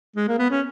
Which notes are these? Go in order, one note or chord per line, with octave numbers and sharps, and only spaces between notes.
G#3
A#3
B3
C#4